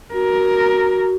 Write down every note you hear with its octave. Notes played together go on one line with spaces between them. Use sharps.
F#4 A#4